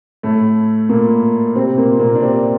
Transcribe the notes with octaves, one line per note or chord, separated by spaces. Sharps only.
A2 A3
A#2 A#3
C3 C4
A#2 A#3
A#2 A#3
D4
C3 C4